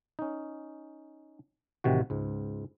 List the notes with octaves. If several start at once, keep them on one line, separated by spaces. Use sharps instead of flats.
C#4 D#4
A1 C3 D#3 F#4
C#2 G#2